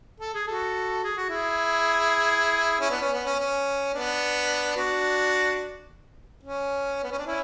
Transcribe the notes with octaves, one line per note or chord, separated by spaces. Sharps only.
A4
G#4
F#4 A4
G#4
F#4
E4 G#4
C#4 E4
B3 D4
C#4
B3
C#4
C#4
B3 D4
D4 F#4
C#4
B3
C#4
D4
C#4 E4